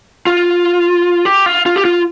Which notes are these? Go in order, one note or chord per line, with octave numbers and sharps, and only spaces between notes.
F4
G4
F4
F4
G4
F4